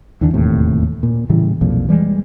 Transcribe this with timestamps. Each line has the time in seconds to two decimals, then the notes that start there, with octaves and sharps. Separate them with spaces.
0.21 D#2 D3 E3 D4
0.33 E1 D#2 A2 C3
1.03 A#2
1.29 A2 C#3 E3 G3
1.61 B1 F2 A#2
1.89 E3 G3 G#3